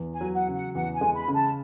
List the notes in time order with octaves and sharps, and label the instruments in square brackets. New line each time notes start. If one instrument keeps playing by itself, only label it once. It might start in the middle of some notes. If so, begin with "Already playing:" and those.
Already playing: [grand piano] E2
[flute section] G#5
[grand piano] F#3
[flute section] F#5
[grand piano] C#3
[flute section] F#5
[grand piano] E2 [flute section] F#5
[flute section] G#5
[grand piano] G#3
[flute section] B5
[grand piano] C#3
[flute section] A5